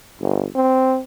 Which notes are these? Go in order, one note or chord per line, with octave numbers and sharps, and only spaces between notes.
G1
C4